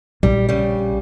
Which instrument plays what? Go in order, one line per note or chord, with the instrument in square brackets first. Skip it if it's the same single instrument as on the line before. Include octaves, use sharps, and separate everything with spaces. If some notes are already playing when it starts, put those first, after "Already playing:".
[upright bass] A#1 [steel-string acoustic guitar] G3
[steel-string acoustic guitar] C#3 G3